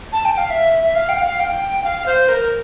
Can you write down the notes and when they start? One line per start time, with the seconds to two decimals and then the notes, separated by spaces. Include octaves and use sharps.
0.12 A5
0.25 G5
0.37 F5
0.50 E5
0.72 E5
0.83 E5
0.95 F5
1.09 G5
1.17 F5
1.40 G5
1.78 G5
1.84 F5
2.06 C5
2.29 A#4